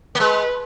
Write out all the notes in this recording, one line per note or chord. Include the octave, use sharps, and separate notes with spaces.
A#3
G#3 B4